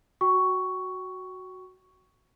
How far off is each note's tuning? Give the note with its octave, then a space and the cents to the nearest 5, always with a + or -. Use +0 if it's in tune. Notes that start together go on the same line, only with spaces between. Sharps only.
F#4 +0 G5 -20 C#6 +5